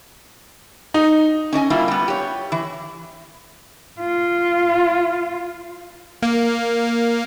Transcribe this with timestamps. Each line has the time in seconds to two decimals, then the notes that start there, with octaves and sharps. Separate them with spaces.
0.94 D#4
1.53 C#4 D4 D#5 G#5
1.70 G3 A#3 E4 F4
1.88 G3 B3
2.08 G4 C#5
2.52 E3
4.00 F4
6.23 A#3